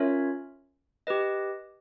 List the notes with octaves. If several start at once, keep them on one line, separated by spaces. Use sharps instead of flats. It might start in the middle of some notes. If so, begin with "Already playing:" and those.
Already playing: C#4 F4 A#4 C#5 E5
G4 B4 D#5